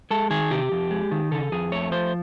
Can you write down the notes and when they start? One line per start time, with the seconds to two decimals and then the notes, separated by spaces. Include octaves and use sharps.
0.11 G#3 A4
0.30 D#3 G#4
0.51 C3 G4
0.72 F2
0.91 G#3
1.12 D#3
1.31 C#3 A4
1.52 F2 G#4
1.72 A3 C#5
1.92 F3 C5